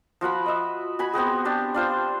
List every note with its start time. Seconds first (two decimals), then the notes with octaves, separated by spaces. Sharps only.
0.21 F3 F#4 F#5 B5
0.46 D#5 E5
0.99 F#4 G#5 B5
1.13 B3 C4 F#4 G#4
1.45 D4 G4 A5
1.74 D4 F4 C5